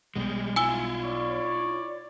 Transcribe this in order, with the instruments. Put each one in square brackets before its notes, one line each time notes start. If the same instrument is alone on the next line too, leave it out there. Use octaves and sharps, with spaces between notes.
[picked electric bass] B1 B2 [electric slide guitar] G3 G#3
[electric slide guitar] E4 F4 [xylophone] G#5 E6 G7
[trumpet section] C#5 D5